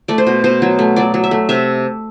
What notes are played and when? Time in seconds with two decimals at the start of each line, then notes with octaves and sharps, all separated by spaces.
0.08 A3 D5
0.18 C5
0.27 B2
0.44 B2 C5
0.62 F#3
0.79 A3
0.96 F#3 D5
1.14 F#3
1.24 E5
1.31 A3
1.49 C3 E5